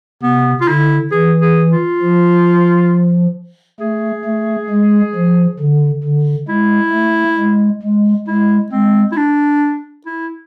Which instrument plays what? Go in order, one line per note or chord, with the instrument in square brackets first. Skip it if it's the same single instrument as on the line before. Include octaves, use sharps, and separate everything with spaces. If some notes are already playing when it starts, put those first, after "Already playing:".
[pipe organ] C3 [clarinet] B3
[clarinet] F4
[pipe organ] D3 [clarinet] E4
[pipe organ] E3 [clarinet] G#4
[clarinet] G#4
F4
[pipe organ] F3
[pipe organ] A3 [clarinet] G#4
[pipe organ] A3
G#3
F3
D3
D3
[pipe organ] G#3 [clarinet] E4
[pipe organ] A3
G#3
G#3
[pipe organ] G#3 [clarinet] E4
[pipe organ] G#3 [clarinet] C4
[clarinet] E4
D4
E4